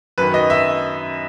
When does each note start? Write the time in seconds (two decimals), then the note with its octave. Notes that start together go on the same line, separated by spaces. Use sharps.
0.18 F#2 D#3 B4
0.34 D#5
0.50 E5